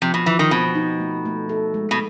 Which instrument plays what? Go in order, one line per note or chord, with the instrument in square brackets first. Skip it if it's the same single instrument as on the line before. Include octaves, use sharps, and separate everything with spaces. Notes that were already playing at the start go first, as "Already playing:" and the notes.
[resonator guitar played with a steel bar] C3 [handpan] F3
[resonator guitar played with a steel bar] B2
[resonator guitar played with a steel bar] E3 [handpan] F3
[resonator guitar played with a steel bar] D#3
[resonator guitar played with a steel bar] B2 [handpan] C4
[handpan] D#4
A3
A3
A4
G#3
[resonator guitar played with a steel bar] B2